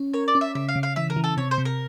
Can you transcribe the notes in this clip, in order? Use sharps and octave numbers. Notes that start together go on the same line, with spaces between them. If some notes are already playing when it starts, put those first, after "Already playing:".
Already playing: C#4
A#4 C#5
D5
C#4
E5
C#3 E5
F5
C#3
F5
E3 E5
A#4
E3
A4
C3 C#5
C5
C3
A#4